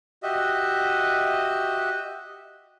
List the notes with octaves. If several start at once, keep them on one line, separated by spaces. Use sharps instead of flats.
F#4 G4 D#5 E5